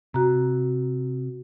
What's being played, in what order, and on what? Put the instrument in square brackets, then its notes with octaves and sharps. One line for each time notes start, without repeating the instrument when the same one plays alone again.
[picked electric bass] C3 [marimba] F#4 A#5